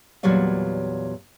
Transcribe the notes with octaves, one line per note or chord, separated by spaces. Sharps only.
E2 A#2 F#3 G3 C#5 F5